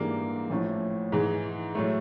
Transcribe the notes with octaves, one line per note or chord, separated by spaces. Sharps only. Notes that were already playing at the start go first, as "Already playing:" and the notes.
Already playing: G#2 E3 G3 A#3 D4
A1 A2 F3 A3 C#4
G#2 E3 G#3
A2 F#3 A3